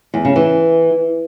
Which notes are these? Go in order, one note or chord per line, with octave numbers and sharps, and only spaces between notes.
E2
C#3
E3